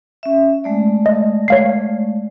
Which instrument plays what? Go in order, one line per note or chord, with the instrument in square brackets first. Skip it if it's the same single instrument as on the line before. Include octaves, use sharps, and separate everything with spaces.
[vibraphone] C#4 E5
G#3 A3 D5
[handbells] D#5
C#5 F5 C7